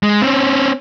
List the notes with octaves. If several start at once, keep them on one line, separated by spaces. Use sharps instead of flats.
G#3
C4 C#4